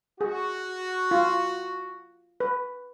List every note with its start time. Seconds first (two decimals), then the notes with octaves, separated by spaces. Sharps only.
0.21 F#4 G#4
1.11 F4
2.40 B4